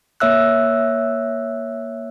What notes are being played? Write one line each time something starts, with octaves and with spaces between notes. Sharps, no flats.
A#3 C#5 E5 E6 F#6